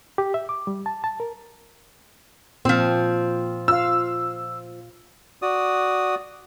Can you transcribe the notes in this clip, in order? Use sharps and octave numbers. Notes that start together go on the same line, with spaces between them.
G4
E5
D6
G3
A5
A5
A#4
A#2 F3 C4
F4 F5 E6
F#4 D5 D#6